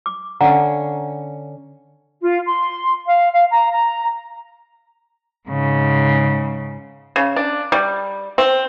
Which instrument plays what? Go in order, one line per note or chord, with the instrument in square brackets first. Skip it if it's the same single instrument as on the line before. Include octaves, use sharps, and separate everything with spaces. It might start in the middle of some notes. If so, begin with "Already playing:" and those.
[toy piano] D6
[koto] D3 C#4 [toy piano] F5 F#5 A#5
[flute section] F4
C6
F5
F5
A#5
A#5
[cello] G#2 C#3
[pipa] C#3
D4
G3
C4